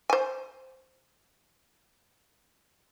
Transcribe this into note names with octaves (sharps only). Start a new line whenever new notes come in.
C5 G#5